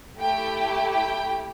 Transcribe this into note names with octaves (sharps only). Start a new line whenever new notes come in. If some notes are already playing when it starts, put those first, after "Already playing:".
A3 E4 G4 G5
G5